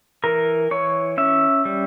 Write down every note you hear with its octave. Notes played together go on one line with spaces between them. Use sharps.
E3 A#4
E3 C#5
C#4 E5
G3